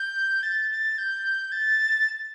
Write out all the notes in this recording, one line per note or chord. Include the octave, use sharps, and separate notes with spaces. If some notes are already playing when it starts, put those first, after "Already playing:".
Already playing: G6
A6
A6
G6
A6